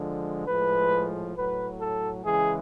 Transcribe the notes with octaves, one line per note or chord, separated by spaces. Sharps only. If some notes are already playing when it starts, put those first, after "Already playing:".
Already playing: D3 F3 G#3
A2 F3 G#3 B4
A2 F#3 B4
A4
C#3 E3 G#3 G#4